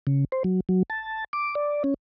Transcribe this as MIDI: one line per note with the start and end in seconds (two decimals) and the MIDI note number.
0.07 0.25 49
0.32 0.43 72
0.44 0.60 54
0.69 0.83 54
0.90 1.24 81
1.33 1.55 86
1.55 1.83 74
1.84 1.94 61